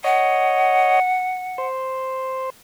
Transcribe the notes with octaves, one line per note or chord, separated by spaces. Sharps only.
C#5 D#5 F#5
C5